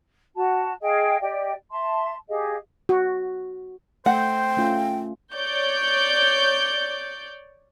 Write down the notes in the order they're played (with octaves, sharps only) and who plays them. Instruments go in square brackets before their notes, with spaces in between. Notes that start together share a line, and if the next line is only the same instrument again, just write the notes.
[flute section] F#4 A5
G#4 D#5 F5 G5
G4 D5 D#5 G5
E5 A5 C6
G4 G#4 D#5 F5
[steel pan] F#4
[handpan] A3 [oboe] C5 [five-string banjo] F#5 [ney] G5
[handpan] A3 C#4 F4
[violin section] C#5 D5 G6